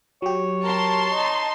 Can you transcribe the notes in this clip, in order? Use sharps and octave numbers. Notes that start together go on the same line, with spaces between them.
F#3 G4 C#5
A#4 A5 C6
D#4